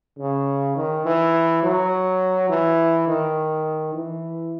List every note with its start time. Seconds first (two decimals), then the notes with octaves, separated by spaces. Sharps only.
0.18 C#3
0.76 D#3
1.06 E3
1.63 F#3
2.49 E3
3.07 D#3
3.94 E3